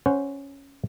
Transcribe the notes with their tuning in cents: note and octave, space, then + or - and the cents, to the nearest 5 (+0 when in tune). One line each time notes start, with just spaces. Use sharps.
C#4 +0 C5 -10 F#5 +0